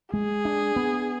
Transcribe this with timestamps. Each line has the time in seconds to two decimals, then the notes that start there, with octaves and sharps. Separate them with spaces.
0.13 G#3 G#4
0.45 D4
0.76 B3